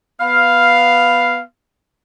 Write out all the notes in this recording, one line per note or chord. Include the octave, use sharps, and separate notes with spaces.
B3 F5